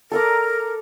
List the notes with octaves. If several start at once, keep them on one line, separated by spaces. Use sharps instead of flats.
A4 A#4 A#5 D6